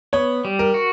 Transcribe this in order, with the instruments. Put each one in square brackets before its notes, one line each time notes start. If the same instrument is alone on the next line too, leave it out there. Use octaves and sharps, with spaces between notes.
[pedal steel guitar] B3 [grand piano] C#5
[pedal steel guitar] G3
[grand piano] A#4
[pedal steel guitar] F#4